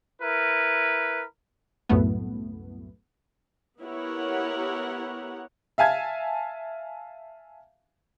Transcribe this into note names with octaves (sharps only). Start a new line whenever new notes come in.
E4 A#4 B4
C2 F#2 A2 A3 B3
B3 E4 G4 A#4 C#5 F#5
E5 F5 G#5 A5 G#6